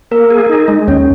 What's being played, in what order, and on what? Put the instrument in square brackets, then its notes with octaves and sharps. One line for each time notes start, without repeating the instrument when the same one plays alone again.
[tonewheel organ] A#3 [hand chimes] A#4
[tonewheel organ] G#4
D#4
G#3
[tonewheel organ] D#2 [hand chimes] C#4 C#5